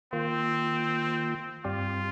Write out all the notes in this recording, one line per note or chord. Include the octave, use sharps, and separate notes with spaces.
D#3 A#3 C4 F4
G2 G3 C4 F4 G4